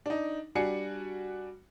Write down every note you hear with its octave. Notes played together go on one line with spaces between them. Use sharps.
D4 D#4
G3 D4 F#4 G#5 C7 C#7